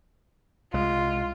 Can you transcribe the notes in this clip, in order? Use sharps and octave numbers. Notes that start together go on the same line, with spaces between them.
C2 G#3 F4